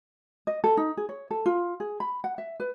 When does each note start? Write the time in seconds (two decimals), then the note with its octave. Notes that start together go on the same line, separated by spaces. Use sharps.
0.47 D#5
0.64 A4
0.77 D#4
0.97 G#4
1.09 C#5
1.31 A4
1.46 F4
1.80 G#4
2.00 B5
2.24 F#5
2.38 E5
2.60 B4